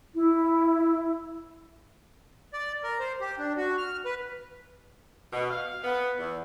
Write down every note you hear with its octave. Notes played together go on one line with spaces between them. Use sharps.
E4
D5
A#4
C5
G4
D4
F#4
F6
B4
B2
F5
B3
E2